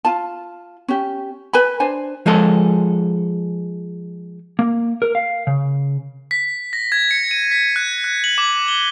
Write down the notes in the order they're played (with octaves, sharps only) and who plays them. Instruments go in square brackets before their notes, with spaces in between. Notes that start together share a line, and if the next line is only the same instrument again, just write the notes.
[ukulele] F4 A5
C#4 G4
B4 G#5 B5
D4 C5 G#5
[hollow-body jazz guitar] F3 G#3 G#4 A4
[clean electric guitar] A#3
A#4
F5
C#3
[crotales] B6
A#6
G#6
C#7
D#7
B6
F#6
F#6
F#7
D6
G7